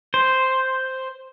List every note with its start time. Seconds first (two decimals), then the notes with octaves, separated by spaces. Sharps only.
0.14 C5